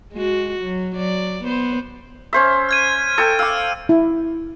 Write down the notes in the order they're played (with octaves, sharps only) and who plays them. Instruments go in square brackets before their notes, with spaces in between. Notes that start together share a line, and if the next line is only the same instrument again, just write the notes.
[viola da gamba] G#3 F#4
F#3
F#3 D5
B3 C5
[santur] C#4 C5 E5
[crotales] F6 G#6 D#7
[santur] A4 G5 E6
[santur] F5 D6 [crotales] E6
[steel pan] E4